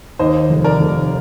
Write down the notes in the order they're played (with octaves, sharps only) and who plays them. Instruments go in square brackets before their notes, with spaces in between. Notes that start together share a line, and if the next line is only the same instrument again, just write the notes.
[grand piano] D#2 [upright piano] C5 D#5
[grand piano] F1
[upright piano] A#4 D5
[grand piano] F1